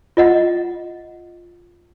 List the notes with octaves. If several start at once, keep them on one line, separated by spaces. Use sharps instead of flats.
F4 D#5 F#5